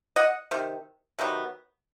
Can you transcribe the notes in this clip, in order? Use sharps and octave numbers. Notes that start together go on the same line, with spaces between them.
D#5 F#5
C3 D#3
C3 D#3 F#3 B3